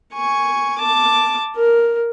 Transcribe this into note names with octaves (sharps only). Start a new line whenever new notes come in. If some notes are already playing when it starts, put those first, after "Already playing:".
G#5 C#6
A5 D6
A#4